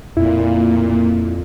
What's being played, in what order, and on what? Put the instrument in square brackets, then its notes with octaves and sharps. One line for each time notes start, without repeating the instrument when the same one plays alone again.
[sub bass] F2 [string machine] A#2 [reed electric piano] E4